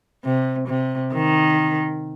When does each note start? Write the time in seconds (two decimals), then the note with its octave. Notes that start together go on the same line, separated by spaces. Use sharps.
0.25 C3
0.68 C3
1.14 D#3